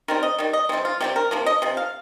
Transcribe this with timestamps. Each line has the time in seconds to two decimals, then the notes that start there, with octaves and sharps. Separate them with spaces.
0.08 D#3 G3 C4 A#4
0.23 D#5
0.38 D#3 G3
0.53 D#5
0.69 C3 G3 C4
0.85 F4
1.01 C3 G3 C4 G4
1.16 A#4
1.31 C3 F3 A#3
1.46 D#5
1.62 C3 F3
1.77 F5